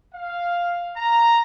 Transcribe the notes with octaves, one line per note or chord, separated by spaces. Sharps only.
F5
A#5